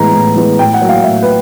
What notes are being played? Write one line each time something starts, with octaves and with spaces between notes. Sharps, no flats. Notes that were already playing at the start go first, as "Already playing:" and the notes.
Already playing: A2 E3 G#3 B3 A#5
A2
E3 G#3 B3
A2 G5
F#5
F#3 A#3
F5
A2 E5
B4